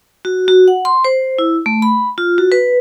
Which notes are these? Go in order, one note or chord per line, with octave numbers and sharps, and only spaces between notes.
F#4
F#4
F#5
C6
C5
E4
A3
B5
F4
F#4
B4